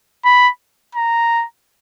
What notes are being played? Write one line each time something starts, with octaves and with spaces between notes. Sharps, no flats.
B5
A#5